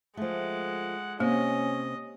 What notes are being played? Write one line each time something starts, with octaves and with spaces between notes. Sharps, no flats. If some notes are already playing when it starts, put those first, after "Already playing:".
F3 G#3 A3 F#5
C3 A#3 C#4 D#5